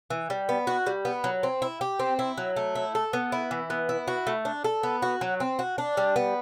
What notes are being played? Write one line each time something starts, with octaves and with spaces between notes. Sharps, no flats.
E3
G3
B3
F#4
G3
B3
F#3
C4
E4
G4
C4
E4
F#3
A3
E4
A4
B3
E4
E3
B3
E4
F#4
A3
D4
A4
B3
F#4
F#3
C4
F#4
D4
G3
B3